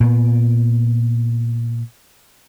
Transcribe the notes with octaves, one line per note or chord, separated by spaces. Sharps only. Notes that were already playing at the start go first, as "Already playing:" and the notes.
A#2 B3